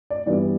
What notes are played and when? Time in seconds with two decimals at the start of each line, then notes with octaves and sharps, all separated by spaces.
0.10 D5
0.26 G2 E3 G3 B3 D5